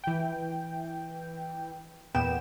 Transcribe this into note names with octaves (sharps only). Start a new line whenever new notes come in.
E3 G5
E2 A#2 B3 G5 E7